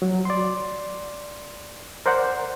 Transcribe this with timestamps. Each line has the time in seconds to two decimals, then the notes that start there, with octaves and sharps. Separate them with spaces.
0.02 F#3
0.25 D5 C6
2.06 A#4 C5 D5 F#5